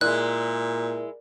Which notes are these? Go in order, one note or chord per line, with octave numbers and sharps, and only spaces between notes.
A#2 G#3 E4 A#4 D5 F#6